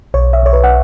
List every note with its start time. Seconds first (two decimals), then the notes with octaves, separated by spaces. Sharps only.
0.14 B1 C#5
0.33 E5
0.43 B1 C#5
0.53 B4
0.64 F#5